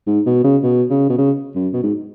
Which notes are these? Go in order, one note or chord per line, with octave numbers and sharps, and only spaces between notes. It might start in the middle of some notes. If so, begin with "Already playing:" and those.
G#2
B2
C#3
B2
C#3
B2
C#3
F#2
B2
G#2